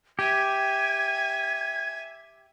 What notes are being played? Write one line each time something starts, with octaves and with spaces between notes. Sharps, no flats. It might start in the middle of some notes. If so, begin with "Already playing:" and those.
G4 E5 G#5 G#6